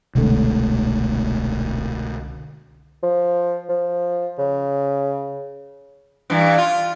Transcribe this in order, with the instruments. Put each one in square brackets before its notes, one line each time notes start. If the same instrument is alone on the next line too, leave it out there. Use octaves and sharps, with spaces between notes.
[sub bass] D#1 [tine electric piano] C2 D3 [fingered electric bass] B2 G#3 A3
[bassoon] F3
F3
C#3
[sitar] G2 E3
F4